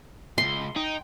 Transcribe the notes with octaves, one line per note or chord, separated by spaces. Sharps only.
C#2 G2 C6
D#4 G5